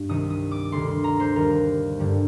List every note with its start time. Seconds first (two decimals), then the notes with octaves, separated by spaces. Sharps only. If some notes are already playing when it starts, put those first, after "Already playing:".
Already playing: G2
0.09 C2 C3 D#3 D#6
0.30 D#6
0.51 D6
0.72 D2 C3 D#3 C6
0.88 C6
1.04 A#5
1.20 C5
1.35 D#2 D#3 G3 A#4
1.99 G2 D3 G3